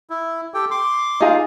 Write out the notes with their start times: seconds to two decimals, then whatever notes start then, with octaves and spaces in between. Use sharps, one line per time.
0.10 E4
0.54 G4 A4 G5
0.71 C6 D6
1.20 D#4 F4 G#4